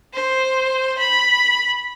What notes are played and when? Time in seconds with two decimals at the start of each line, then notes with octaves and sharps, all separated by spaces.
0.14 C5
0.98 B5